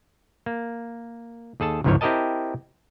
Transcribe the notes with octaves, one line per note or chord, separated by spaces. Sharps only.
A#3
D#2 G#4 A4 A5
G1 C#2 G#2 E3 F3 C#5
C4 E4 G4 A#4 D#5 A5